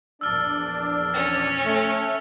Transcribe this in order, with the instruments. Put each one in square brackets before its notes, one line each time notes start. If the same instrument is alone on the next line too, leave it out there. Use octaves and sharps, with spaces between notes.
[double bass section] A#1 E2 [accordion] D4 D5 [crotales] E6 F6 A6
[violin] C#4 [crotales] A6
[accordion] A3